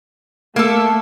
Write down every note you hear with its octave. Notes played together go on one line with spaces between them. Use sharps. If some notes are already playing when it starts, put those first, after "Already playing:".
A3 A#3 A4